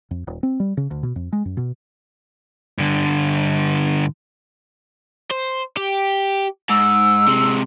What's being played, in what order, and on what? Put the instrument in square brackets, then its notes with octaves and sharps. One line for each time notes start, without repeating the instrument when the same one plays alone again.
[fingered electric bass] F2
D#1
C4
G3
C#3
D2
B2
F2
G#3
F#2
B2
[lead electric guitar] G2 D3
[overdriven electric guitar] C5
G4
[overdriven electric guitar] G#2 [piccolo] E6
[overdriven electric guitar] C3 G#3